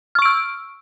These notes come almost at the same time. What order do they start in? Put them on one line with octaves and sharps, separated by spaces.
F6 C#6 D7 E6